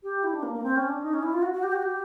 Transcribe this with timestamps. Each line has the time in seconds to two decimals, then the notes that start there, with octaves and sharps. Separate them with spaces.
0.03 G4
0.24 E4
0.33 D4
0.43 A#3
0.54 A#3
0.63 C4
0.76 C#4
0.89 D4
1.03 D#4
1.14 C#4
1.23 E4
1.33 F4
1.43 F#4
1.53 F#4
1.63 G4
1.72 F#4
1.82 G4